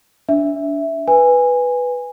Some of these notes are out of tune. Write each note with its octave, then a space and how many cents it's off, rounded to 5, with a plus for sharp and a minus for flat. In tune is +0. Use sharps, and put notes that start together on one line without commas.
D4 -25 E5 +0
B4 +0 G#5 -15